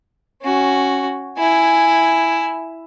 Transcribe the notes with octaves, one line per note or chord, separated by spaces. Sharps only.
C#4 F#4
E4 G#5